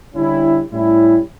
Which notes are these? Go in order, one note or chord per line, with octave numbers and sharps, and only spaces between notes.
D3 G3 C#4 E4
A2 G3 C#4 E4